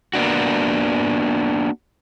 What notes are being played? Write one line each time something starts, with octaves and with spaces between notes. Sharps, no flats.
A#3 B3 D4 F#4